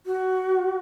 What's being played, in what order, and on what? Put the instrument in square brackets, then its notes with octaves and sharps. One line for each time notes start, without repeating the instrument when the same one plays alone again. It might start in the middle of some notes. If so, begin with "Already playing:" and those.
[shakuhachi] F#4